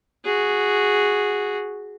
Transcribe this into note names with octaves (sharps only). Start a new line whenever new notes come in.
F#4 G#4